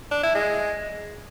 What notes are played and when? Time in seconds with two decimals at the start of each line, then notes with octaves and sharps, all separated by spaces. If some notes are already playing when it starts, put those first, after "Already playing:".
0.11 D4
0.23 E4
0.35 G#3